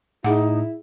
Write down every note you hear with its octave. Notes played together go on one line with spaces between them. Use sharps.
A2 D#4 E4 G#4 F#5